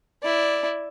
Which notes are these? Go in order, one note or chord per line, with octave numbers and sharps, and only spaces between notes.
E4 D5